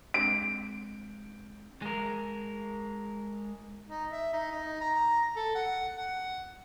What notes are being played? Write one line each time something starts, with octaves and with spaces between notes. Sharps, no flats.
G#3 C4 D4 D7
G#3 A#4
D#4
E5
D#4
D#4
A#5
A4
F#5
F#5